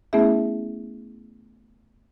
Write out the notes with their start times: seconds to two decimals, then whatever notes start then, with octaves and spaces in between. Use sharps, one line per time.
0.13 A3 B3 C#4 E4 G#4 E5